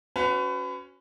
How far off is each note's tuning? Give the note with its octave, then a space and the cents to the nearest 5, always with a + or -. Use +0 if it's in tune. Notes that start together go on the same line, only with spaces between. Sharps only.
C#4 +0 F#4 +0 B4 +30